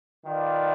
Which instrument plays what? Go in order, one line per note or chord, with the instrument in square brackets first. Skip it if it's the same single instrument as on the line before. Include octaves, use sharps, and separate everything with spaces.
[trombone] D#3 [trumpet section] F4 B4 D5 F5